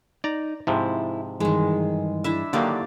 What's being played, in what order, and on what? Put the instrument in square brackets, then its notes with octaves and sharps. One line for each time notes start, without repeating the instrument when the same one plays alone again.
[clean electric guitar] D#4 [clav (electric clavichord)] D5 A#5
[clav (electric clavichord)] G#2 C3 F3 [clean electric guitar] E4
[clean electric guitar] G2 E3 G#4 [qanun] D#3 G#3
[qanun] D4 E4 E5
[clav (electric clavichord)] D3 D#3 F#3 [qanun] A#3 G4 D5